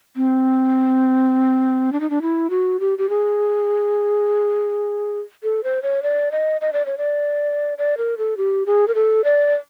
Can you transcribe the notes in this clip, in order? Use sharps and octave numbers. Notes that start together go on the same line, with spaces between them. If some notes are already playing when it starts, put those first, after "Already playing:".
C4
D4
D#4
D4
E4
F#4
G4
G4
G#4
A4
C5
C#5
D5
D#5
D#5
D5
C#5
D5
D5
A#4
A4
G4
G#4
A#4
A4
D5